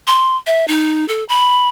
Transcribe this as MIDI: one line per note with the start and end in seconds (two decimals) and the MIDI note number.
0.07 0.36 84
0.46 0.67 76
0.68 1.07 63
1.08 1.24 69
1.29 1.69 83